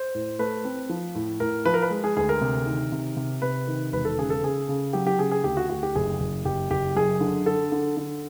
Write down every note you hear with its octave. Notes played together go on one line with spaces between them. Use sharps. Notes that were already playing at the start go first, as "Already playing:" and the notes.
Already playing: C5
A2
A3 B4
C4
F3
A2
A2 A#4
F3 B4
A#4
B4
G#3
G#4
D2 G#4
A#4
C3
D#3
C3
C3
C3 B4
D#3
E1 B4
A4
C#3 G#4
A4
C#3 G#4
C#3
F#3 G4
G4
C#3 G#4
G#4
D2 G4
F#4
D2 F#4
G4
F#1 G#4
F#1
F#1 G4
F#1 G4
F#2 G#4
D3
D3 A4
D3
D3